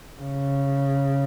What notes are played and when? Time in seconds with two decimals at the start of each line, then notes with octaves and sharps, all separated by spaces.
0.21 C#3